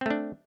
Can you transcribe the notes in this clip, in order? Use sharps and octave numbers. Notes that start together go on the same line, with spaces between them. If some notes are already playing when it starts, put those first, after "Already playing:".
A3 C4 D4